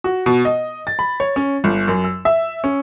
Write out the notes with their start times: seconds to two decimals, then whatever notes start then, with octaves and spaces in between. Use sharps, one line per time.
0.04 F#4
0.26 B2
0.45 D#5
0.87 A6
0.99 B5
1.20 C#5
1.36 C#4
1.64 G1
1.88 F#2
2.04 E6
2.25 E5
2.64 C#4